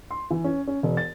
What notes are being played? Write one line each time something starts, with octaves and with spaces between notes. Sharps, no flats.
C6
E3
C#4
C#4
E1
A6